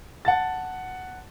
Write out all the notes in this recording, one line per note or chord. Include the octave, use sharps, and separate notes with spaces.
F#5 A5 A6